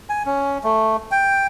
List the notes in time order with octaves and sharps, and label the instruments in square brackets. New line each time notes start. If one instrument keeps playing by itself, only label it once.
[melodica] G#5
C#4
A3
G5